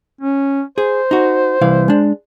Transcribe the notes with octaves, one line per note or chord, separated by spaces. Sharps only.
C#4
G#4 C5
D#4 F#4
C2 E3 F5
G#3 D4